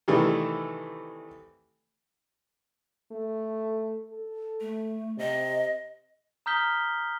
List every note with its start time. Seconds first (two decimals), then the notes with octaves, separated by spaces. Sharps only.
0.08 C3 D#3 E3 G3 A3
3.12 A3
4.10 A4
4.61 A3
5.18 C3 D#5
6.46 A#5 D#6 F6 G6 B6 G7